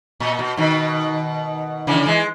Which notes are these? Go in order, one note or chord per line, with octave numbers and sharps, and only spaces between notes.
A#2
B2
B2 D#3
C#3 E3
E3 G#3